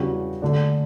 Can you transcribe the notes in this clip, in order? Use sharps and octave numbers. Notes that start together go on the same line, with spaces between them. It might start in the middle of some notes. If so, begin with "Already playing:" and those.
Already playing: E2 C#3 G3 D4 F#4
D3 A3 D4